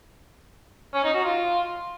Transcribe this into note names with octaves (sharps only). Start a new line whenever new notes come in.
C#4
D#4
F#4
F4